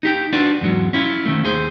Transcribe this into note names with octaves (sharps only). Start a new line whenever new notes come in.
D#4 G4 G5
D4 F4 F#4 B4 D5
E2 G#2 F#3
C#4 E4 F4
D#3 A3
D#2 G#4 C5